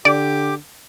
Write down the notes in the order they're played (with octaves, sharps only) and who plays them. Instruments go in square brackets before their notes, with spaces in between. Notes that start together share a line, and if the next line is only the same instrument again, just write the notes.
[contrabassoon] D3 [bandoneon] G4 D6 [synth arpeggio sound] D5